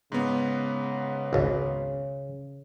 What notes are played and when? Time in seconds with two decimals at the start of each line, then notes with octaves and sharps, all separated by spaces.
0.12 G#2 C#3 B3
1.33 G#1 C#2